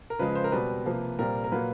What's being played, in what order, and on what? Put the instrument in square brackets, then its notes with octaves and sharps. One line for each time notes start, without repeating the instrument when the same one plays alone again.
[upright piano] A#4
C#3 F3 G#3 B4
C5
A#4
B2 G3 C4 B4
C3 F3 A#3
A#2 G3 C4 A#4
A#4
A#2 F#3 A#3 B4